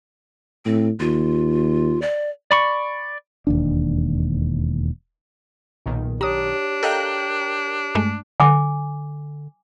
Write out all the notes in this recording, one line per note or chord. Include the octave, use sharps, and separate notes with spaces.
A2 C4
D#2 F4
D5
D5 B5 C#6
E1 D#2 D4
B1 A#2 D#3
D4 G4 C#5 A#5 D#6
A4 A#4 D#5 F5 G5 F#6
G2 G#3 A3
D3 G#5 D6